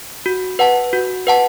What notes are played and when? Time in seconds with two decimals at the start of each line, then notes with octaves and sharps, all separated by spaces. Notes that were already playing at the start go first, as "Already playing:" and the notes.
0.26 F#4
0.59 B4 F#5 A5
0.93 F#4
1.27 B4 F#5 A5